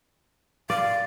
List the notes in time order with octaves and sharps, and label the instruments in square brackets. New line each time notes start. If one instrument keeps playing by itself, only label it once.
[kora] D5 [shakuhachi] F5